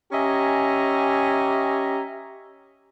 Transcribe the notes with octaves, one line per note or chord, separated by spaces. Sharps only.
C#4 G4 D#5 E5 G#5 A#5